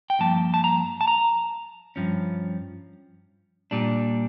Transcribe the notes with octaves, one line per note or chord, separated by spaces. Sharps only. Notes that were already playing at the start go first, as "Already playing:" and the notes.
G5
G2 F3 A#3 A5
A5
A#5
A5
A#5
G2 F3 C#4
A#2 G3 D4